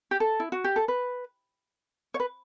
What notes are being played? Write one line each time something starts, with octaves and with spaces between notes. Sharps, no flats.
G4
A4
E4
F#4
G4
A4
B4
C#5
B4